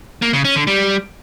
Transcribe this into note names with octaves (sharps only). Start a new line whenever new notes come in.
A#3
C#3
C#4
D3
G3